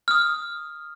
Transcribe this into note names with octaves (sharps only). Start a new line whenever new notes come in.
D#6 F6